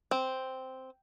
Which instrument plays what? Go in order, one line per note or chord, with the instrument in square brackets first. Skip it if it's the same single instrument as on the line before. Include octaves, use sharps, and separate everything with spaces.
[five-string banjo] C4